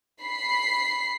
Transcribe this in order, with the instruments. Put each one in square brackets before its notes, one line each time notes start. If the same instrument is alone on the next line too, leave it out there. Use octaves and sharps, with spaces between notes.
[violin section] B5 B6 C7